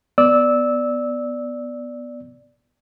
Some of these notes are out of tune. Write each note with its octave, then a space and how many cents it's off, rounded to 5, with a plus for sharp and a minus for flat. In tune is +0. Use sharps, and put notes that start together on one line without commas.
B3 +0 D5 +0 E6 -15